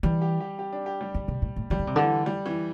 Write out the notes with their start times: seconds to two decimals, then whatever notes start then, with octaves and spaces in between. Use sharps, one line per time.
0.03 E3 G3
0.21 G4
0.40 G4
0.59 G4
0.72 D4
0.86 G4
1.01 G3
1.14 D3
1.28 C3
1.42 A2
1.56 A2
1.70 E3 G3
1.79 D3
1.87 C3
1.96 D3 E3
2.26 G3
2.46 E3